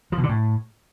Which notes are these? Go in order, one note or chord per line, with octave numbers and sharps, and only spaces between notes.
F3
B2
D3
A2